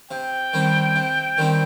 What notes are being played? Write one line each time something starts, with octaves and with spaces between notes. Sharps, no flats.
C3 G5
D#3 G3 C4
C3
D#3 G3 C4